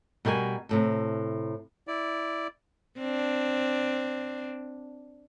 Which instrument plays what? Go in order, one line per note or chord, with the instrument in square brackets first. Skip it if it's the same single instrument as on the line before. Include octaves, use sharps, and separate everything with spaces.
[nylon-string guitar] B2 G3 A#4 D5 G#5
D2 A2 C3
[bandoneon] E4 D5
[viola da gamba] C4 D4